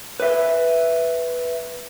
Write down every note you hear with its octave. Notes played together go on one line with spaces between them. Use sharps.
B4 E5